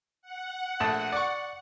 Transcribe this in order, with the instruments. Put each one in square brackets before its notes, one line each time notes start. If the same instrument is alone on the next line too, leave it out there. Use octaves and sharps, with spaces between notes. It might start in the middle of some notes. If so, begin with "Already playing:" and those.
[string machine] F#5
[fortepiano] A#1 A3 A5
D5 C#6